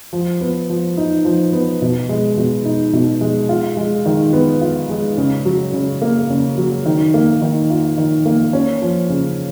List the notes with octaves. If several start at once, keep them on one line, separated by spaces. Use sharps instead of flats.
F3
B3
F3
D#4
F3
B3
B2
G#3
B2
D#4
B2
G#3
F4
G#3
D#3
B3
F4
G#3
C#3
F#3
C#3
A#3
C#3
F#3
D#3
A#3
D#3
F4
D#3
A#3
C#4
F3
C#3